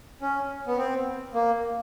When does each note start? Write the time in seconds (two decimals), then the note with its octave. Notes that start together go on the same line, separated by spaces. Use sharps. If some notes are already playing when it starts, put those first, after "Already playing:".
0.21 C#4
0.67 B3
0.77 C4
1.34 A#3